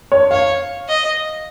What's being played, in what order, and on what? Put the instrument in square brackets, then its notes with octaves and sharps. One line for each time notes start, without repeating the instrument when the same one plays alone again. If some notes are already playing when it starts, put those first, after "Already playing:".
[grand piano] C#5
[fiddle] C#5 [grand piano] F5
[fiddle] D#5